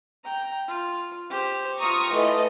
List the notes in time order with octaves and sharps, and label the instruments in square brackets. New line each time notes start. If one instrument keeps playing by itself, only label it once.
[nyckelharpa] G5 A#5
F4
G4 C5
[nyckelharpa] F4 G4 [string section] A#5 C#6 D#6
[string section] E3 A3 D#5